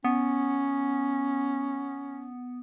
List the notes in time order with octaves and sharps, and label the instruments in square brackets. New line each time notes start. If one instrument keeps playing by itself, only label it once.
[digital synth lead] B3 [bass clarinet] C#4